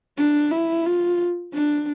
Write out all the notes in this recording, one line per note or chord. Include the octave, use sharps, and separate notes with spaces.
D4
E4
F4
D4